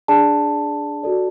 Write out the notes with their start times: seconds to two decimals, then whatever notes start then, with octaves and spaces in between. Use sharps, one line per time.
0.08 D4 G#4 D5 A5
1.03 F#4 A4 D5